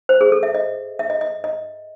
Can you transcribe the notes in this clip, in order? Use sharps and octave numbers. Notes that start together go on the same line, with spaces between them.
C5
G#4
A4
E5
D#5
E5
D#5
D#5
D#5